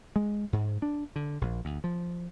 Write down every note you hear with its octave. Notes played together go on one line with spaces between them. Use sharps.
G#3
G#2
D4
D3
A#1
D2
F3